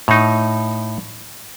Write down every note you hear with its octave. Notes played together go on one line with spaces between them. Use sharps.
A2 D#4